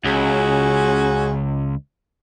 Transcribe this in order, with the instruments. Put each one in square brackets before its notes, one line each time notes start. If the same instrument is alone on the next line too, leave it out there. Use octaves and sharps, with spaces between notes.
[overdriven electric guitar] C#2 [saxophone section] C#4 F#4 G#4